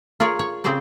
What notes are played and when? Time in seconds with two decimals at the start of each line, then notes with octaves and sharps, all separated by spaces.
0.20 F4 G#4 A#4 C#5 D5
0.39 C#5
0.64 C#3 C4 G4 G#4 C5 D5